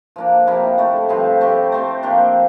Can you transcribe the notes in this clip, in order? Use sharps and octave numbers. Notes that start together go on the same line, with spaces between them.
F3 A#3 D4
C3 F3 A#3 E4
D3 A3 E4
G2 F3 C4 E4
A3 C4 G4
A3 C4 G4
F3 A#3 D4 G4